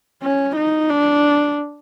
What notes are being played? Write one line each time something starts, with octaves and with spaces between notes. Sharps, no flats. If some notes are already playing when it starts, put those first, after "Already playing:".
C#4
D#4
D4